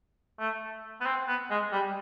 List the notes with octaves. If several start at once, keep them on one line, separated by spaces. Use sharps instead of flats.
A3
B3
C4
B3
G#3
G3